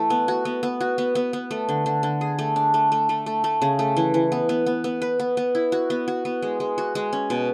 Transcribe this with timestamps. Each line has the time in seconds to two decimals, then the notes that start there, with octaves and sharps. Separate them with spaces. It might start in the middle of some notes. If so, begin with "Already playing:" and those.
Already playing: E3 A3
0.10 B3
0.28 F#4
0.45 B3
0.63 B3
0.81 F#4
0.98 B3
1.15 B3
1.33 B3
1.51 A3
1.69 D3
1.86 D3
2.03 D3
2.21 G#4
2.39 A3
2.56 D4
2.74 A3
2.92 A3
3.09 A3
3.26 A3
3.44 A3
3.62 C#3
3.79 A3
3.97 E3
4.14 E3
4.32 B3
4.49 B3
4.66 B3
4.84 B3
5.02 B4
5.20 B3
5.37 B3
5.55 E4
5.72 F#4
5.90 B3
6.08 F#4
6.25 B3
6.42 G#3
6.60 G#3
6.78 F#4
6.95 G#3
7.13 C#4
7.30 B2